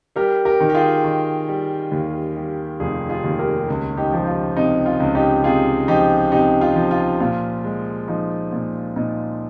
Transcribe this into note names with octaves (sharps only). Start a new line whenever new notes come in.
G3 G4 A#4
G4 A#4
D#3
G4
F4 G#4
D#3
G3
D#2
G3
F1 F4 G#4
F4 G#4
D#2
G4 A#4
C#2
D#4 G4
F3 G4
F4
C3 D#4
F4
C#2
D#4 G4
C3 F4 G#4
F3 D#4 G4
C3 D#4 G4
F4
F3
F4
A#2 F4
G#3
F3 D#4
A#2
A#2 D#4